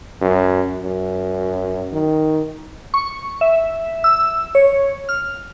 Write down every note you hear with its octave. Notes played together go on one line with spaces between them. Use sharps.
F#2
F#2
D#3
C#6
E5
E6
C#5
F6